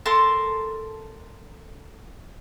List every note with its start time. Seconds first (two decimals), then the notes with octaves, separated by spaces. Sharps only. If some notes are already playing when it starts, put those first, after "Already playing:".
0.06 A4 A#4 A5 C6